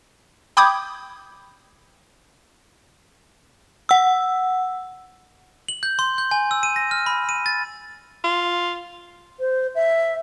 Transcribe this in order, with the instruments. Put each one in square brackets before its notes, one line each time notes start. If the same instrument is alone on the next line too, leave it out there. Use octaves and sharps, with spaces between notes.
[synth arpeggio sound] G5 B5 D6 D#6 G6 G#6
[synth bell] F#5 E6
[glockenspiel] F#7
G6
C6
G6
G#5
E6
D#7
A#6
F6
B5
D#7
A6
[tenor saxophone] F4
[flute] C5
E5